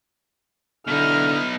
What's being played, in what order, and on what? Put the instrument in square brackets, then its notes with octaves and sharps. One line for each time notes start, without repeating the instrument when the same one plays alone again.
[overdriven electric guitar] B2 D#4 [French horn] D3 [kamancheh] E4 F6